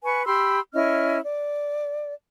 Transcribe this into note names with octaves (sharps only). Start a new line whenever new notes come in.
B4 G#5 C#6
G4 B5 C6 E6
C#4 E4 D#5 F6
D5